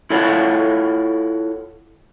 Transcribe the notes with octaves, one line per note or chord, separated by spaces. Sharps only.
E4 F4 A4 C#5 F5 F#5